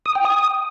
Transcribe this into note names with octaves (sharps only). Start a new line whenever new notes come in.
D#6
G5
D#6